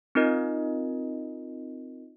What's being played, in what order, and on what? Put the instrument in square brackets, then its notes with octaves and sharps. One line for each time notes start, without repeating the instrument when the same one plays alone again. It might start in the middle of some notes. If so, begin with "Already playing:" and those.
[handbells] C4 D#4 F4 A#4 D#5